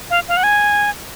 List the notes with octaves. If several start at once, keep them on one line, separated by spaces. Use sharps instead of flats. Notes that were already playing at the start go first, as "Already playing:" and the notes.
F5
F5
F#5
G#5